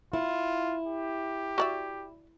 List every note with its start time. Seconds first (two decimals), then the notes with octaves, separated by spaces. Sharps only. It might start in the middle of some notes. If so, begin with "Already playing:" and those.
0.13 E4 F4
0.87 G4
1.58 F#4 D5 E5